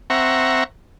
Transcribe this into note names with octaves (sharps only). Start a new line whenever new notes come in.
C4 E5 F#5 A#5 C#6